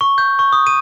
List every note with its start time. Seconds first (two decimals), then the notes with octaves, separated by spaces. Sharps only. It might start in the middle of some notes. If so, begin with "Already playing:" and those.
0.01 C#6
0.18 G6
0.39 C#6
0.53 D#6
0.67 D#7